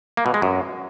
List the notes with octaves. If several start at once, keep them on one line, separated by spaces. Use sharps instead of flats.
A#3
B2
G#3
F#2